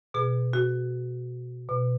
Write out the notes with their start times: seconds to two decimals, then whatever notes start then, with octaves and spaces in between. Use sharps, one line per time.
0.14 B2 G#4
0.53 F#4
1.69 B2